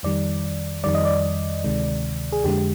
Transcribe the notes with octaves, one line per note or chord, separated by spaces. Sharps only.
F2 D#3 G3 D5
F2 D#3 G3 D5
D#5
D5
D2 C3 D#3 G#3
G#4
F2 D3 G#3 G4